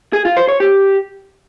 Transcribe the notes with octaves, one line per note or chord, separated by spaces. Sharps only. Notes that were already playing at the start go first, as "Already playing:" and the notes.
G#4
F4
C5
C#5
G4